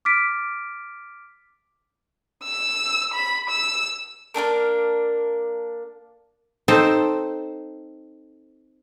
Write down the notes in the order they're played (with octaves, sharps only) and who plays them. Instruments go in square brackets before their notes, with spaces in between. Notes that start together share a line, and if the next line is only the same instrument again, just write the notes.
[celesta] D6 F6 A6 B6 D7
[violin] E6
B5
E6
[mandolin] A#3 C4 D4 A#4
[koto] C4 D#4 A4 C5